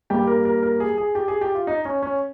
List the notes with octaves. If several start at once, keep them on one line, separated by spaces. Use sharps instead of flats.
G2 G3 A#3 G4
A#4
A#4
A#4
G#4
G#4
G4
G#4
G4
F4
D#4
C#4
C#4